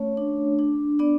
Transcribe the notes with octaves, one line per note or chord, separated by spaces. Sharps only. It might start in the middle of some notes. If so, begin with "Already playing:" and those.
Already playing: A3 C#4 C#5
D4
D4
B3 D4 D5